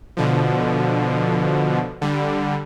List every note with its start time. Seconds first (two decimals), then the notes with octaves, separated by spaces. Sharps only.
0.17 B2 D3 F3
2.01 D3 G3